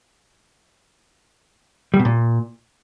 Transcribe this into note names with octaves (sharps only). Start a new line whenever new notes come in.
G3
B2
A#2